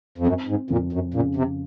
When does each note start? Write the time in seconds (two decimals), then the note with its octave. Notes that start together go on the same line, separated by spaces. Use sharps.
0.18 F2
0.27 F#2 C4
0.48 G#2
0.70 F2 A#2
0.93 F#2
1.14 A#2 C#3
1.36 C3